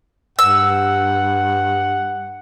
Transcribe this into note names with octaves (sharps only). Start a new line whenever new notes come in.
G2 F#5 E6